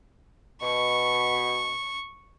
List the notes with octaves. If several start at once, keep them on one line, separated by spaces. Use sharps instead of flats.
B2 C#6